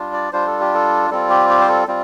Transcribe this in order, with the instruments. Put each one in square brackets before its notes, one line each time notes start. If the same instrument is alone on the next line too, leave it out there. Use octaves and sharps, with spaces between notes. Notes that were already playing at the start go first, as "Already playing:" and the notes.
Already playing: [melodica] G3 D4 F4
D5
G3 D4 F4 C5
A4
G4
A4
G3 C4 F4 A4
G4
G4
C5
A4
G3 C4 F4